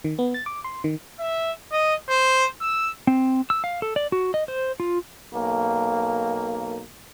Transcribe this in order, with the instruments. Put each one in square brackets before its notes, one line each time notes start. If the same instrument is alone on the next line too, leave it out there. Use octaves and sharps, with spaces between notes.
[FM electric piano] D#3
B3
A6
D6
C6
D#3
[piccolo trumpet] E5
D#5
C5
E6
[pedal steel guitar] C4
E6
F5
A4
D5
F#4
D#5
C5
F4
[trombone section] B1 A#3